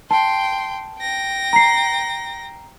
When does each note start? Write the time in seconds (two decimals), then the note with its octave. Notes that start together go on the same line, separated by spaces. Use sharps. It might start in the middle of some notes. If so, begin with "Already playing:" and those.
0.11 G5 A5 C6
0.99 G5 A#6
1.53 A#5 C7